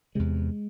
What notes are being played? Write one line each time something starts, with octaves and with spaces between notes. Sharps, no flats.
E2 C3 G#3